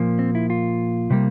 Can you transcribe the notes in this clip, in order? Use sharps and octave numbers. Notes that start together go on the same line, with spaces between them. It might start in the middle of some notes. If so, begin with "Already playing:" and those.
Already playing: A#2 F3 A#3
C4
E4
F4
C3 G3 A#3